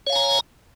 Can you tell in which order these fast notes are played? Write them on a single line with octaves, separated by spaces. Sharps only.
C#5 F5 G#5 A#5